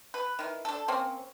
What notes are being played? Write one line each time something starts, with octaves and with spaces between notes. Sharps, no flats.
B4
D#3 E3
D4 A4
A#3 C4 C#4